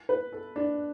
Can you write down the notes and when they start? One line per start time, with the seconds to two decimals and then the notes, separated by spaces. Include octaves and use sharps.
0.09 B4
0.32 A4
0.56 D4